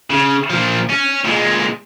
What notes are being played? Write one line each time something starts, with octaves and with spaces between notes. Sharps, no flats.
C#3
A#2 F3
C#4
A#2 G#3